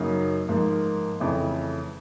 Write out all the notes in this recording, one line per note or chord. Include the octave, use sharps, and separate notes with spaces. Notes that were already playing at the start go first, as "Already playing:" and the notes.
Already playing: F#2 C#3 F#3 A#3 D#4
G#2 F3 A#3
F2 C#3 E3 A3